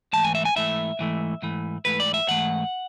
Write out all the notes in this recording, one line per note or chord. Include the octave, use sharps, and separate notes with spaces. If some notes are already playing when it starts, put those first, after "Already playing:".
G#2 E3 A3 A5
G#5
E5
G#5
G#2 E3 A3 E5
G#2 E3 A3
G#2 E3 A3
G#2 E3 A3 B4
D5
E5
G#2 E3 A3 F#5